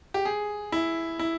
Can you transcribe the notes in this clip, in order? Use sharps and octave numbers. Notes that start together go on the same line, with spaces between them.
G4
G#4
E4
E4